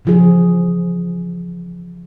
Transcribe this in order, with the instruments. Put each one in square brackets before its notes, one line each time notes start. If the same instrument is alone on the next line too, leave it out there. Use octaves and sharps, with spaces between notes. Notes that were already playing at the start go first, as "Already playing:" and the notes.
[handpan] C#3 E3 F3 F4 G#4